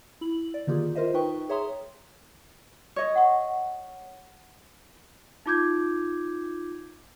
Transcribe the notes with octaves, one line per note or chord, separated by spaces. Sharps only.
E4 F#7
D5
D3 D#3 A#3 F4 G4 G#4
F4 A#4 C5 D#5 E5
D#4 B4 G5 C#6
G#4 C#5 E5 A#5 C6 D#6
C#5 D#5
F#5 C#6
D#4 F4 D6 G6 G#6